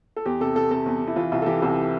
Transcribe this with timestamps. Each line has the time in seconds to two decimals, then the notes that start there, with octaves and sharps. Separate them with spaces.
0.16 A4
0.26 E2 G4
0.40 C3 A4
0.56 C3 A4
0.71 C3 A4
0.86 E2
1.02 C3
1.07 E4
1.16 E3 F4
1.32 C2 F4
1.42 A4
1.46 E3 G4
1.62 C2 A4